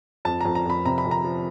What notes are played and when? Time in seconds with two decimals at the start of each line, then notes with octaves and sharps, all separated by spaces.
0.25 F2 A5
0.41 F2 A#5
0.55 A#5
0.66 F2 B5
0.85 C3 A#5
0.98 B5
1.05 F2
1.11 A#5
1.24 F3